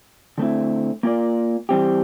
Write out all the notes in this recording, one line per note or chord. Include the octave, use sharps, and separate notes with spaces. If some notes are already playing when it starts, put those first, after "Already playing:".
D3 A3 C4 E4
A#3 F4 A#4 D5
E3 G3 C4 G4